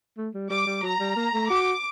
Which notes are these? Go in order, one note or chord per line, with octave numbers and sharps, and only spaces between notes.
A3
G3
G3 D6
G3
F#3 A#5
G3
A#3
A3
F#4 D6